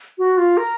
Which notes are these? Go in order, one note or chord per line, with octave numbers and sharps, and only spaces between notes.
F#4
F4
A#4